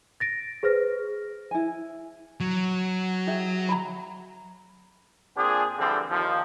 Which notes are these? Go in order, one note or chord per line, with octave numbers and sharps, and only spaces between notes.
A6 A#6 D7
G#4 B4 C5 F6 A#6
E4 G#5
F#3
G4 G#4 E5
A#5 B5
A#2 C4 D4 G#4
D3 E3 F3 G3 C4
D#2 F3